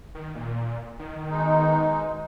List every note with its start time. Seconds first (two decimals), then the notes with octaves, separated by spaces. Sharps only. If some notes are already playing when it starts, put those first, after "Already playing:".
0.15 D#3
0.35 A#2
0.99 D#3
1.30 B2 G#3 D#4